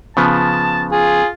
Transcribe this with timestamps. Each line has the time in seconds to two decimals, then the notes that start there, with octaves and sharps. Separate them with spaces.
0.17 C#3 F3 B3 A5
0.92 F4 G#4